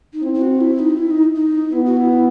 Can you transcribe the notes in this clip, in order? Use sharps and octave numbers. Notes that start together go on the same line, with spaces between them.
D#4
C4 E4
E4
F#4
E4
D#4
E4
D#4
D#4
B3 E4
F#4
E4